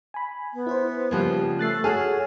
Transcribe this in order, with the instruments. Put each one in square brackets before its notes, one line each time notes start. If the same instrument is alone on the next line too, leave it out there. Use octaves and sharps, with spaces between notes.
[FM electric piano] G#5 B5
[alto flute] B3
[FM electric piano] E4 B4 C5
[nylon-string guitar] C#3 F3 G3 [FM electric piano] A#3 G4
[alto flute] A3 [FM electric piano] F#6 A6 C7
[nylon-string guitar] F#4 G#4 [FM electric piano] A4 G#5 F6 [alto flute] C#5